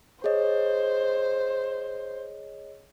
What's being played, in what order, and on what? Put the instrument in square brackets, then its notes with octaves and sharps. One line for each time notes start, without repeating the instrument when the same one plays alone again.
[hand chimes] G#4 C#5 D#5 [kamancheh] C5